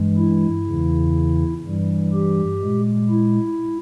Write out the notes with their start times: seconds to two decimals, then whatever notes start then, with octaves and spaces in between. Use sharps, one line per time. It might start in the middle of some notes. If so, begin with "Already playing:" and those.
Already playing: G2 E3 G#3
0.17 E4
0.66 E2 C#3 E3
1.64 G2 E3 G3
2.13 G4
2.61 A#2 G#3
3.10 E4